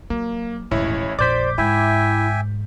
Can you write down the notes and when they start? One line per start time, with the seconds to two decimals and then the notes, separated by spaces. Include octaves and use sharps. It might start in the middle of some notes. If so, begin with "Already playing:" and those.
0.10 F#3 A#3
0.71 D#1 A1 G#2 E4 C#5
1.19 A#1 F2 C5 D5 D6 G6 B6
1.58 G#2 E4 E5 G5 G#5